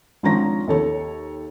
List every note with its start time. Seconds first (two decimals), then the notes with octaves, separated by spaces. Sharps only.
0.23 G#1 F3 C#4 D4 A#5 A#6
0.68 D#2 A4 C#5